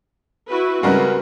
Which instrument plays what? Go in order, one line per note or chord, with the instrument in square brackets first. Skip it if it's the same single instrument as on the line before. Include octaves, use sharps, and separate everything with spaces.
[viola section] E4 F#4 B4
[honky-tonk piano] C#3 G3 G#3 [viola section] C4 [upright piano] F#4 A#4 B4